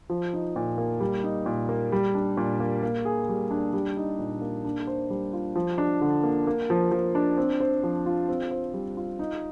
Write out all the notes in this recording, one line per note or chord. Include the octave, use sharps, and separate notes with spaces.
F3
D#4
A#2
A#3
G3
D#4
A#2
A#3
G3
D4
A#2
A#3
A#3
G#4
G3
D4
G3
D#4
A#2
A#3
D4
C5
G3
F4
F3
D4
D3
A#3
A#3
F3
F3
D4
C4
C5
F3
F4
C4
C5
G3
F4
D#4